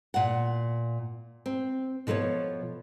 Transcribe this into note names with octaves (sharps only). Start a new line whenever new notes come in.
A#2 F#5
C4
B2 F3 A4 A#4 C#5